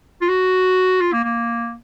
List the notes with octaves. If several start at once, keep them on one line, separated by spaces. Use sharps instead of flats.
F4
F#4
F4
A#3
A#3